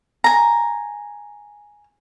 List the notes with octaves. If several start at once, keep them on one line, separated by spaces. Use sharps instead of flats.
G#5 A#5